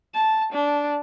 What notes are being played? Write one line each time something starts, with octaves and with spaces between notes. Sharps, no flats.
A5
D4